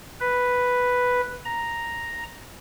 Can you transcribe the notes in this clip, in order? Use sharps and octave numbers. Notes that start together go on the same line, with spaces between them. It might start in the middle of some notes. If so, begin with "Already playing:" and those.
B4
A#5